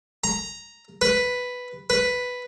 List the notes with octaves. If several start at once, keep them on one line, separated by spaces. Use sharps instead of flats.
A#5
B4
B4